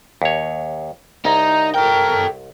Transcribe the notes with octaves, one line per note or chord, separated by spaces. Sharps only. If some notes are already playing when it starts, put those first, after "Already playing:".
D#2 C#5
C2 D#4 A#5
A4 A#4 G5